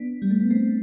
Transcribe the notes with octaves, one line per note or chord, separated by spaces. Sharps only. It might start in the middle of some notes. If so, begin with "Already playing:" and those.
Already playing: B3 D4
G3
A3
B3
A3 C4